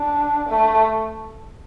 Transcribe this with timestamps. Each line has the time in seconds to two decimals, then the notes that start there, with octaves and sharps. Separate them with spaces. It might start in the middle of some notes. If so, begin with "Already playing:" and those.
Already playing: D4
0.49 A3